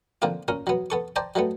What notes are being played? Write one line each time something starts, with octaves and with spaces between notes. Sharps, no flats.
D3 F3 A#3 C4 F4
A#2 C#4 A#4
F#3 B3
B3 A4 C#6
C5 D5 G5 A5 A#5
F#3 G3 A3 B3